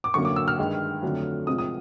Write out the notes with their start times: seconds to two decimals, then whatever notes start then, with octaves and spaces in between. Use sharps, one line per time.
0.04 D6
0.14 F#2 D3 F#3 A#3 C#6
0.25 D6
0.36 E6
0.48 F6
0.59 G2 D#3 G#3
1.02 F2 D3 F#3 A3
1.47 C3 F3 G#3 D#6
1.58 D#6